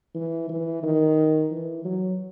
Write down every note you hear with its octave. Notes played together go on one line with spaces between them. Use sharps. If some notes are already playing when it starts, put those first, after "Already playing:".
E3
E3
D#3
E3
F#3